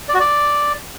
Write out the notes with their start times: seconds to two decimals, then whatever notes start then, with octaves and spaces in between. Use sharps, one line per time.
0.09 D5
0.14 F#4
0.20 D5